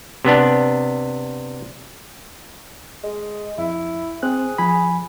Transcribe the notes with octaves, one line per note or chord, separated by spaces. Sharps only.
C3 B3 D4
G#3
F2 E4
C4 G#4 F#6
F3 G#5 B5